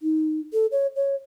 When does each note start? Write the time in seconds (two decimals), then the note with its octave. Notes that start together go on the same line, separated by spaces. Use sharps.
0.02 D#4
0.53 A4
0.72 C#5
0.96 C#5